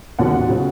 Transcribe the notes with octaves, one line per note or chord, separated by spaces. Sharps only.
D#2 C#3 F#3 F#5
C#3 F#3